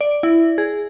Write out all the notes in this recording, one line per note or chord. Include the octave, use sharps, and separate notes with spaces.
D5
E4
G#4